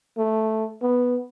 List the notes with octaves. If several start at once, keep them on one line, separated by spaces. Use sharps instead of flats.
A3
B3